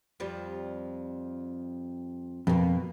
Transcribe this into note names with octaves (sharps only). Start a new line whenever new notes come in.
F2 F3 G3
F2 B2 A#3